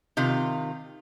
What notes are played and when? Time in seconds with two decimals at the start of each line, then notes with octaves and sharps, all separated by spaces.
0.17 C3 D#3 F4